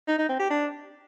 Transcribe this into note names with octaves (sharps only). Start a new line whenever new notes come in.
D#4
D#4
C4
G4
D4